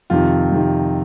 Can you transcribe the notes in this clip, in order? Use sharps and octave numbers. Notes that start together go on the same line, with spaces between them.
F2 C3 D#3 F4
F2 C3 D#3